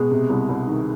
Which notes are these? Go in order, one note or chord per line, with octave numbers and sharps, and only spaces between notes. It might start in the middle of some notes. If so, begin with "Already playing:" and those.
Already playing: B2 G#3
C3
C2
C2
D#3